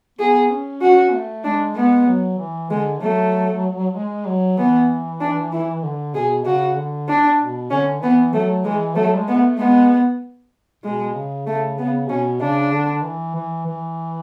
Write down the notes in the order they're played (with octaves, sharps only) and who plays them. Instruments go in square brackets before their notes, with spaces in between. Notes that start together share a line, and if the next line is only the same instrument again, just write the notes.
[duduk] B3 [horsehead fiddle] G#4
[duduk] C#4
[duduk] C#4 [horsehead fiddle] F#4
[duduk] A3
[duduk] G#3 [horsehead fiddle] D4
[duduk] G#3 [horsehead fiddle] B3
[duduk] F#3
E3
[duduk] D3 [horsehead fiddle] G#3
[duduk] F#3 [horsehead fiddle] A3
[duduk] G#3
F#3
[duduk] E3 [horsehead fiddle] B3
[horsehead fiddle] D4
E4
[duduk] D3
[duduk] B2 [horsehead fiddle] G#4
[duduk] C#3 [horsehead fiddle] F#4
[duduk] D3
[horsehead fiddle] D4
[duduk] B2
[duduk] D3 [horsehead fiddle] C#4
[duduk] E3 [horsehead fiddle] B3
[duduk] F#3 [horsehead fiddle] A3
[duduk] E3 [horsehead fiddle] G#3
[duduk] F#3 [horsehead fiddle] A3
[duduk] G#3
[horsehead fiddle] B3
[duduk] A3
[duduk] G#3 [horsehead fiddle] B3
[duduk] B2 [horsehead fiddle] G#3
[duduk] C#3
[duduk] C#3 [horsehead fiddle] A3
[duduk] C#3 [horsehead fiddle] B3
[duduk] B2 [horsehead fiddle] C#4
[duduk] C#3 [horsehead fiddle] D4
[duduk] D3
E3
E3
E3